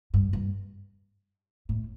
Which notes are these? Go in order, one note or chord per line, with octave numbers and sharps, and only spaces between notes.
G2
G2
A2